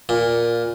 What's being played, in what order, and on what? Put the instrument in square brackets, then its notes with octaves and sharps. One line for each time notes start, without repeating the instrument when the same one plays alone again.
[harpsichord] A#2